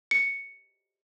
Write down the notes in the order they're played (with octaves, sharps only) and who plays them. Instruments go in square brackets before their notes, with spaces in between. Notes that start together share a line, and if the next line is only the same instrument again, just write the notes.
[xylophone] C#7